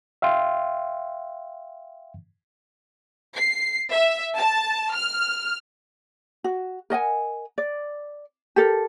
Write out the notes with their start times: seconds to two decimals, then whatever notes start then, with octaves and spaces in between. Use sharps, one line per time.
0.22 E5 F5 G5 C6
3.36 C7
3.91 E5
4.36 A5
4.94 F6
6.44 F#4
6.90 A#4 D#5 F#5 G#5
7.58 D5
8.56 G4 A4 A#4